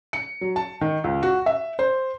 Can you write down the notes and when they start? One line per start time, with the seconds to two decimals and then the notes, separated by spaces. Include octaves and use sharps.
0.13 C#7
0.41 F#3
0.56 A5
0.81 D#3
1.04 C#2
1.23 F#4
1.46 E5
1.79 C5